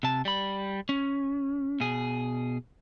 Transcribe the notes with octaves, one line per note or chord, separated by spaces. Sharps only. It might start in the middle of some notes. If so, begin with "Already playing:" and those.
C3 A5
G3 B5
C#4
B2 G#4